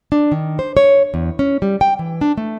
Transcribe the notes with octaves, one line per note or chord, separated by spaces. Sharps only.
D4
D#3
C5
C#5
E2
C#4
G3
G5
E3
D4
A3